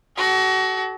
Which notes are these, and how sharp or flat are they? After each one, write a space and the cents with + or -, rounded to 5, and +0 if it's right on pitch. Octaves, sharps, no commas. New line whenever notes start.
F#4 +30 A4 -35